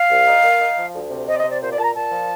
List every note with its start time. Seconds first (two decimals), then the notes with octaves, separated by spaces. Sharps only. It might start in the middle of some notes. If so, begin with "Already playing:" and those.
Already playing: F5
0.09 C2
0.27 D#4
0.43 A#3
0.60 D#4
0.77 F3
0.93 D2
1.10 C3
1.27 C4 D#5
1.34 D5
1.39 D#5
1.44 C3
1.50 D5
1.61 A#2 C5
1.72 D5
1.77 A#2 A5
1.83 A#5
1.95 A#2 A5
2.11 F3